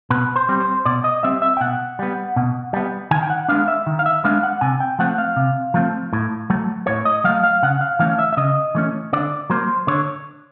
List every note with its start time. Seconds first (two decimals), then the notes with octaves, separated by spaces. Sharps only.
0.10 B2 B4
0.36 C5
0.49 G3 C4
0.60 C5
0.85 B2 D5
1.04 D#5
1.23 G3 C4 E5
1.42 E5
1.57 G5
1.61 B2 F#5
1.99 G3 B3
2.36 B2
2.73 G3 B3
3.11 D#3 G#5
3.23 G5
3.30 F#5
3.48 G#3 B3 D4 F5
3.68 E5
3.86 D#3
3.99 F5
4.06 E5
4.24 G#3 B3 D4 F5
4.43 F#5
4.61 C3 G#5
4.80 G5
4.99 F3 A3 C4 F#5
5.18 F5
5.36 C3
5.74 F3 A3 C4
6.13 A2
6.50 F#3 A3
6.87 A2 C#5
7.05 D#5
7.24 F#3 A3 F5
7.44 F5
7.63 C#3 F#5
7.81 F5
7.99 E3 A3 C#4 F5
8.19 E5
8.33 E5
8.37 C#3 D#5
8.75 E3 A3 C#4
9.13 D3 D5
9.50 F#3 A#3 C5
9.87 D3 C#5